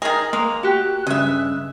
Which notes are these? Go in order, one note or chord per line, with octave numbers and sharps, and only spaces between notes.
D#3 G#4 A#4 D#5
G#3 A#3 A#5
F#4 G4 F#6
G2 C#3 D#5 E5